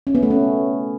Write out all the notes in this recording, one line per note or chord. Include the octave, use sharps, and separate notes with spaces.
C#4
B3
A3
C#4